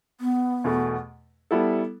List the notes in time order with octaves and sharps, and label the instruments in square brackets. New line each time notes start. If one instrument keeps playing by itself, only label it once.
[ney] B3
[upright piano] E2 B2 A3
G3 B3 E4 A4